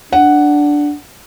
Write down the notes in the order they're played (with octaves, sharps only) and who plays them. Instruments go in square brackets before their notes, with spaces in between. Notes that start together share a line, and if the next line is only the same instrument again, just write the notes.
[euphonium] D4 [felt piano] F#5